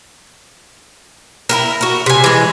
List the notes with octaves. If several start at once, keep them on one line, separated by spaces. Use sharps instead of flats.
E4 F#4 A#4
F#4 A#4
C3 G#5
E3 G#3